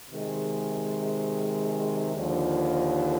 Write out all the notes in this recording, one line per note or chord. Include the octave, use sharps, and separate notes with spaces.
C3 D#3 G#3
D#2 D3 F3